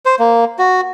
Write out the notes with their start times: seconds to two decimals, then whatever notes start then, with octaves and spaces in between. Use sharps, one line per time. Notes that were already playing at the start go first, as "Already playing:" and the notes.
0.05 C5
0.19 A#3
0.59 F#4